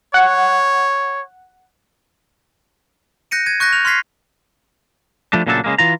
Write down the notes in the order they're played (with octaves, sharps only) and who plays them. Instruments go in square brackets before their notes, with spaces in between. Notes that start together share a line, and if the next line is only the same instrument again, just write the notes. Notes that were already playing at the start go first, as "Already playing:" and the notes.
[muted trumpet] C#5 [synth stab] F#5
[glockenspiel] F#6 G6 A#6 C#7 D#7
G#6 D#7
C#6 F#6 G6 A#6
F6 F7
C6 F6 G#6 B6 C7
[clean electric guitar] F3 G3 A3 D4
A#2 C#3 F#3 A3 D4 A4
C#3 G#3 A#3
E3 F4 A#5